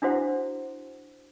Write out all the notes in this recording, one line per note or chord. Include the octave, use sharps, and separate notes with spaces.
D4 E4 F#4 C5 F#5